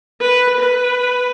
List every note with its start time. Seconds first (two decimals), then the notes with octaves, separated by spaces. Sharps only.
0.21 B4
0.60 B4